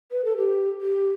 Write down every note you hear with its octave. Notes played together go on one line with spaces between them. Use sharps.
B4
A4
G4
G4